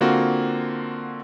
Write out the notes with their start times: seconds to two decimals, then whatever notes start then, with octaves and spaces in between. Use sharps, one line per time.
0.01 D3 A#3 C4 F4 F#4